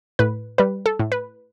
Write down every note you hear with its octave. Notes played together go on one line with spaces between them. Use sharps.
A2 B4
G3 B4
A4
A2
B4